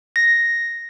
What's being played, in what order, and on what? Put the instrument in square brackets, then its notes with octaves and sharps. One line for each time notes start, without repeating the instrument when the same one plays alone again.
[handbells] A#6